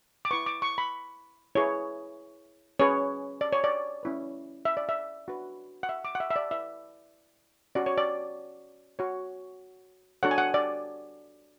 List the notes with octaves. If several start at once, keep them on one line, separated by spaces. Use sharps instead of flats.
D6
E4 B4 C#6
D6
C#6
B5
E4 G#4 B4 C#5
C#4 G#4 B4 C#5
D5
C#5
D5
C#4 E4 B4
E5
D5
E5
D4 F#4 B4
F#5
E5
D6
F#5
E5
E5
D5
E4 B4 E5
C#4 F#4 C#5 D5
C#5
D5
F#4 C#5
D4 F#4 A4 C#5 F#5
G#5
F#5
D5